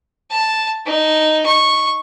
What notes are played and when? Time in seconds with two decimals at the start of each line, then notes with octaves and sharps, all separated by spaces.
0.31 A5
0.86 D#4
1.46 C#6